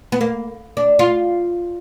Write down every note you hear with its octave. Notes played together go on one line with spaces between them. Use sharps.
B3
A#3
D4
F4